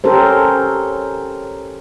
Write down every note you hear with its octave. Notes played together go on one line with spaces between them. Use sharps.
C#4 G4 A4 A#4 C5